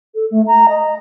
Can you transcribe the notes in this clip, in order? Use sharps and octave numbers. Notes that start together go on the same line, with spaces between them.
A4
A3
A#5
D#5